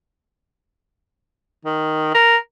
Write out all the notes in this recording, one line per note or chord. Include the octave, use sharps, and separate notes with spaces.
D#3
A#4